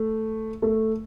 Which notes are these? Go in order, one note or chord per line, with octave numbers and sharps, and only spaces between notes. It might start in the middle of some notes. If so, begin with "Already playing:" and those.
Already playing: A3
A3